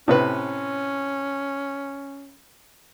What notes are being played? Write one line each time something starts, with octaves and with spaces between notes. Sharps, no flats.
A2 C3 C#4 B4